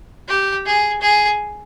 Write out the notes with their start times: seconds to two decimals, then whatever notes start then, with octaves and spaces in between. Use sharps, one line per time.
0.28 G4
0.66 G#4
1.01 G#4